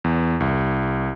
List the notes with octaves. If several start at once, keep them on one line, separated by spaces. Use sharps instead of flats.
E2
C2